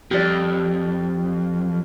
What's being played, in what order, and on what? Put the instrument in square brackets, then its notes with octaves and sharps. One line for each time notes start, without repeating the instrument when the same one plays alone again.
[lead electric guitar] F2 [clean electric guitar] G4 D5